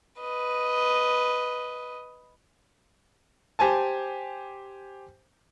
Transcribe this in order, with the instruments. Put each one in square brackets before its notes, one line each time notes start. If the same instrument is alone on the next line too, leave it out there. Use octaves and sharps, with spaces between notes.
[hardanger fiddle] B4 D#5
[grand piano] G4 C5 G#5 A5